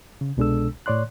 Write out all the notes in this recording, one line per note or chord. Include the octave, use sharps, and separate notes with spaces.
C#3
C2 B2 G#3 D4 A4 E6
A2 C#5 D5 C6 F#6